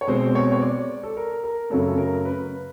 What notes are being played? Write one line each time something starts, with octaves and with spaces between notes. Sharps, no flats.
C#5
B2 G#3 C4 C5
C#5
C#5
D5
A4
A#4
A#4
F#2 C#3 F#3 A3 A4
A4
A#4
B4